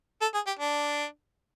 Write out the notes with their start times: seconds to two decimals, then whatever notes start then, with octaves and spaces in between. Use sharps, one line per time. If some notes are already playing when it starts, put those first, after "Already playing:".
0.22 A4
0.34 G#4
0.47 G4
0.59 D4